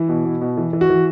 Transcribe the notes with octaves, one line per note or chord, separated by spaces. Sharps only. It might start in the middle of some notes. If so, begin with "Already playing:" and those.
Already playing: E3 E4
B2
B2
B2
E3
E3
F#4
E3